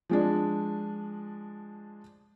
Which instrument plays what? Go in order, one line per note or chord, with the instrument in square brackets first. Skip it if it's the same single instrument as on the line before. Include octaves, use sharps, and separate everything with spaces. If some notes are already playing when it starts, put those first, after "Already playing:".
[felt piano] F3 G#3 D4